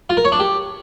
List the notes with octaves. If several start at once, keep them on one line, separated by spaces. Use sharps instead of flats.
F4
A#4
C#5
D4
G4